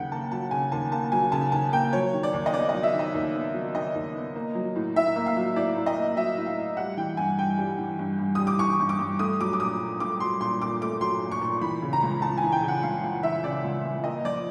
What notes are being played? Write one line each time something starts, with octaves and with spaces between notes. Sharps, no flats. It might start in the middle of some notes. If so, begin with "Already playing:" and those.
Already playing: D#2 C#3 F#3 F#5 G5
A#3 A5
F#3 A5
C#3 G#5
D#2 A5
A#3 A5
F#3 G#5
C#3 A5
D#2 A5
A#3 G5
F#3 C#5
D#3
D5
D#2
D#5
B3 D5
D#5
F#3
E5
D#3
D#5
D#2
B3
F#3
D#3 D#5
D#2
B3
A#3
F#3
A2
A2 E5
A#3
F5
F#3
A2 D5
A2
D#5
A#3
F#3 E5
A2
F5
A2
G3 F#5
E3 G5
G2 G#5
G2 G5
G3
E3
G2
G2
G3 D#6
D6
E3 C#6
G2
D6
G2
A3 D#6
F#3 D6
D6
A#2 D#6
A#2
A3 D6
F#3 C6
A#2 C6
A#2 D6
A3 D6
F#3 C6
A#2
C#6
A#2
E3 B5
C#3
A#5
C#2
C#2 A5
G#5
E3
G5
C#3
F#5
C#2 F5
C#2 F5
E3 E5
C#3 D5
C#2
C#2
A#3 D#5
F3 D5